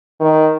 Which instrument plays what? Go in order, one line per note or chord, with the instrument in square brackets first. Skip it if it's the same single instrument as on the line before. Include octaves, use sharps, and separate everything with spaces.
[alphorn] D#3